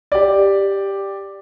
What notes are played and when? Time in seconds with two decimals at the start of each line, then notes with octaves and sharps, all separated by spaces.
0.12 G4 D5